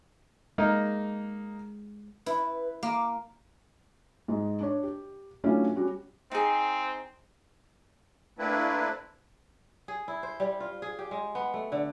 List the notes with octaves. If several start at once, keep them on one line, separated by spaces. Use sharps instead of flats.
G#3 A#3 D#4
E4 B4
A#3 D6
G#2 D#4
D4 C#5
G4
F#3 A3 C#4 D4 E4 F4
G3 C#4 F#4
C4 D#4 G#4
A3 A#3 C4 D4 E4 B4
G#4
E4
C5
G3
F4
G#4
G4
G#3
B3
A3
D3